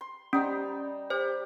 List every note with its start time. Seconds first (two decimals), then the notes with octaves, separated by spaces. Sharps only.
0.01 C6
0.33 G3 C#4 D#4 C5
1.10 G4 C5